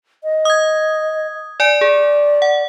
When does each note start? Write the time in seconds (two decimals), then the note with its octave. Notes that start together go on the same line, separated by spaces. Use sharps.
0.24 D#5
0.45 D#6 G#6
1.60 D5 G#5 D7
1.81 G#4 D5
2.42 F#5